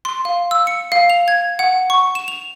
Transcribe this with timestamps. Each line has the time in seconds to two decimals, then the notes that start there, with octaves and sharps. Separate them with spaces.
0.05 C6
0.25 F5
0.51 E6
0.67 C#7
0.92 F5
1.10 F7
1.28 G#6
1.59 F#5
1.90 C#6
2.15 E7
2.28 F7